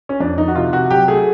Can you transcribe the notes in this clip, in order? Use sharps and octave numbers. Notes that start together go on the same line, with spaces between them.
C#4
F2 D4
D#3 D#4
F#4
C3 F4
C3 F#4
F#3 G4
A3 G#4